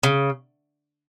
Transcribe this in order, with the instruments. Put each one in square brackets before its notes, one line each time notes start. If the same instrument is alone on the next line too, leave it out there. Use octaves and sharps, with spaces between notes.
[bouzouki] C#3